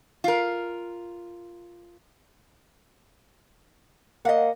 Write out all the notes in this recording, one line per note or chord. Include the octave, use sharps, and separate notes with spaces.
F4 A#4
A#3 D#5 F#5